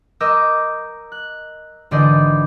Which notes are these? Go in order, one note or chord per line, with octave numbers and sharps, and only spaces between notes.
A#4 D#5 D6 E6 G6
F#6
G#1 D3 E3 D5 D#5 G6